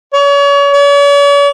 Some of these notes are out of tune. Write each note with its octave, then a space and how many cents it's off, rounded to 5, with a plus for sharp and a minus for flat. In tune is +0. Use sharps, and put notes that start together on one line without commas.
C#5 +35
C#5 +45